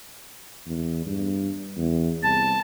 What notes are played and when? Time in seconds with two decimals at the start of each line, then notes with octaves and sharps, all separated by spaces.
0.67 E2
1.06 G2
1.78 E2
2.23 C2 A5